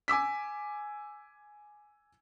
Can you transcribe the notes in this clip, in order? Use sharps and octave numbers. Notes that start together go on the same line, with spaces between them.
G#5 D6 E6 B6